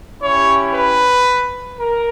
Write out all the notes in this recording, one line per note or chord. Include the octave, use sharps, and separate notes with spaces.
C#4 E4 G4 C#5
B4
A#4